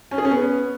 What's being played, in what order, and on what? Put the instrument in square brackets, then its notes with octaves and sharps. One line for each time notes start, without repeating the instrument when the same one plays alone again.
[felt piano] C#4
G#4
C#4
B3